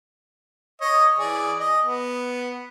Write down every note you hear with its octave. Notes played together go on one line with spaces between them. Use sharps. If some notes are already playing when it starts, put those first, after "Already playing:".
C#5 D#5
E3 G#4 D5
D#5
B3